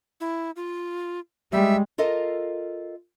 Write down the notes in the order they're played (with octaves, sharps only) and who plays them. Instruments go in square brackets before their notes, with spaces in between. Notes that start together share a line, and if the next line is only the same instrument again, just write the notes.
[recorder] E4
F4
[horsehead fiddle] G3 [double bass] G#3 [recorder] E5
[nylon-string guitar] F4 A4 A#4 D#5 F5